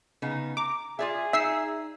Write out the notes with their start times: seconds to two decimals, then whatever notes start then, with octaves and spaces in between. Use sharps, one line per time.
0.22 C#3 B3 D#4
0.57 A#5 D6
0.99 F4 G#4 D5 E5
1.33 D#4 E5 E6 C7